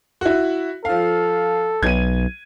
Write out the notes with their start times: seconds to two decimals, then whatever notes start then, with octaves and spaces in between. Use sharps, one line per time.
0.21 E4 F#4
0.85 F3 A4 F5
1.83 B1 G#6 D#7